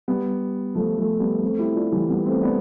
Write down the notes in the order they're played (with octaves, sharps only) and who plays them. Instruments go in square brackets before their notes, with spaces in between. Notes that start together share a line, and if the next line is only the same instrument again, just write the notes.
[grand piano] G3 B3
F3 A3
F3 A3
G3 B3
A3 C4
E4 G4
D4 F4
E3 G3
G3 B3
A3 C4
B3 D4